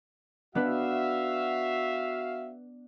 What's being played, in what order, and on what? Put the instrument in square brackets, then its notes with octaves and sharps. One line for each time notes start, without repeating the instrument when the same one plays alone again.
[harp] B3 D4 B4 [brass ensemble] F#4 E5 F5